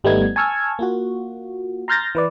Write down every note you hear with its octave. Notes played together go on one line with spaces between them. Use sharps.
G#1 G3 A3 B3 D#4 G#6
G#5 A5 C#6 E6 F6 G#6
A#3 F4 F#4
A#5 C6 F6 G6 A6 A#6
E3 B4 D5